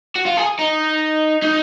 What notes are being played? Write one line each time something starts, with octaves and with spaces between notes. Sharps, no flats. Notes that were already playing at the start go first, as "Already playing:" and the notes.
F#4
F4
G#4
D#4
D#4